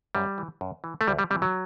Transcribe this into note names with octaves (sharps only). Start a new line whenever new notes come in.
F#2 G3
E3
F#2
E3
A3
D2 G3
G3
C3 E3 G3
F#3